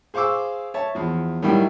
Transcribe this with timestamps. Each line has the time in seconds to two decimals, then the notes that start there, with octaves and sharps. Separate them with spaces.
0.14 G#4 C5 F5 C#6 D6 E6
0.74 C#5 E5 A5
0.95 E2 F3
1.42 A2 D#3 F#3 G3 E4 G5